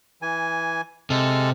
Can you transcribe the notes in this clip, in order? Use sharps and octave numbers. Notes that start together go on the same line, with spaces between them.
E3 G#5
C3 G#3 A4 F6